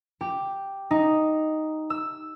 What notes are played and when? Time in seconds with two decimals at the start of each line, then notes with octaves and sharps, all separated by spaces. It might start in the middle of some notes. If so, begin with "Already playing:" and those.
0.21 G4
0.91 D#4
1.90 E6